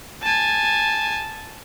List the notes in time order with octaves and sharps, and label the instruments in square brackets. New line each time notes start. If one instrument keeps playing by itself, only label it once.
[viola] G#5 A5